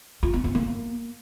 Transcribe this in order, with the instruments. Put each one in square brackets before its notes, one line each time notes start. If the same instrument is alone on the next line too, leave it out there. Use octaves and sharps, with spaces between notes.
[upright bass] F4
B3
A#3
A#3